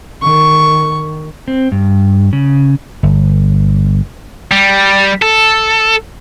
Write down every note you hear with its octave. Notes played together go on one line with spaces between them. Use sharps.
D#3 C#6
C4
G2
C#3
G1
G3
A4